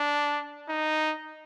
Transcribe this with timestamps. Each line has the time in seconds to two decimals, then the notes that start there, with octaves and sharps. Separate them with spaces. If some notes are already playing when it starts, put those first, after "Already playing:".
Already playing: D4
0.69 D#4